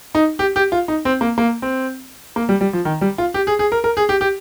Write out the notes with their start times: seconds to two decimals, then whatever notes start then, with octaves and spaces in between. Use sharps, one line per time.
0.15 D#4
0.39 G4
0.56 G4
0.72 F4
0.88 D#4
1.05 C4
1.21 A#3
1.38 A#3
1.62 C4
2.36 A#3
2.49 G3
2.61 G3
2.73 F3
2.85 D#3
3.01 G3
3.18 F4
3.34 G4
3.47 G#4
3.59 G#4
3.72 A#4
3.84 A#4
3.97 G#4
4.09 G4
4.21 G4